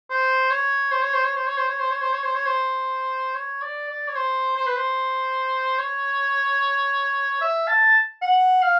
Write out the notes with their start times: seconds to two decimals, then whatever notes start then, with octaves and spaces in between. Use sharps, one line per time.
0.10 C5
0.50 C#5
0.91 C5
1.02 C#5
1.13 C5
1.24 C#5
1.36 C5
1.47 C#5
1.57 C5
1.68 C#5
1.79 C5
1.91 C#5
2.01 C5
2.13 C#5
2.23 C5
2.35 C#5
2.46 C5
3.35 C#5
3.62 D5
3.89 D5
4.08 C#5
4.16 C5
4.56 C5
4.66 B4
4.76 C5
5.78 C#5
7.41 E5
7.67 A5
8.22 F#5
8.62 F5